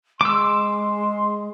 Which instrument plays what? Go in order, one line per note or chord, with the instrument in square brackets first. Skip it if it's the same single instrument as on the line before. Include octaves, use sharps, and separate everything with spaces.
[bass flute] G#3 [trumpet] C6 [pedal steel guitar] D6 E6